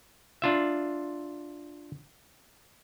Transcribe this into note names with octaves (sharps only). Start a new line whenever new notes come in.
D4 F4 E5